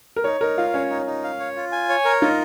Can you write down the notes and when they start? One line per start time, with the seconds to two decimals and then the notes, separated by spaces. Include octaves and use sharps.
0.16 A#4
0.24 D#4 C#5
0.41 D#4 A#4
0.58 F4 F5
0.73 C#4 C#5
0.90 D#4
1.06 D#4
1.24 F5
1.40 C#5
1.56 F4
1.72 G#5
1.89 C#5
2.05 A#4
2.21 D#4 F4